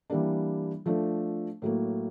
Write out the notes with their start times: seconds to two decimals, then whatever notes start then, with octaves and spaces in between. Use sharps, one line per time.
0.10 E3 G3 A#3 D4
0.86 F3 A3 D4
1.62 A2 F#3 A#3